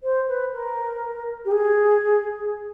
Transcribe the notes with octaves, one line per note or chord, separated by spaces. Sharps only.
C5
B4
A#4
G4
G#4